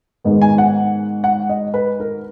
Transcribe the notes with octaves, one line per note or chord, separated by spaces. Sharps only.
G#2 D#3 G#3 B3
G#5
F#5
F#5
D#5
B4
A#4